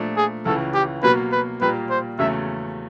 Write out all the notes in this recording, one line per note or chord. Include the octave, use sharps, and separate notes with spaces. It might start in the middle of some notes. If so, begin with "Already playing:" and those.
Already playing: A#2 F3 A3 D4
G#4
C#2 C#3 E3 A4
G4
B2 F#3 A#3 B4
B4
A#2 G3 A#3 B4
C5
E2 C#3 F#3 A3 C#4 E5